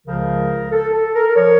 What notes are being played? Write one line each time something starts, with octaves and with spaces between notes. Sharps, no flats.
C#2 C#3 F3 A#4
A4
A4
A#4
F3 C#5